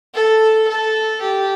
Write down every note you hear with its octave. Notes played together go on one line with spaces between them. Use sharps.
A4
A4
G4